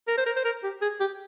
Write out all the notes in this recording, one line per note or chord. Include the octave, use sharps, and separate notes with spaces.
A#4
C5
A#4
C5
A#4
G4
G#4
G4